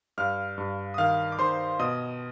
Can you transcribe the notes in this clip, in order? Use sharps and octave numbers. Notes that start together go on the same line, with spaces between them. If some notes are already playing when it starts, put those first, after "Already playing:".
G2 F5 F6
G2
D#6
D#3 F5 F6
D6
D#3 C5 C6
B2 D#5 D#6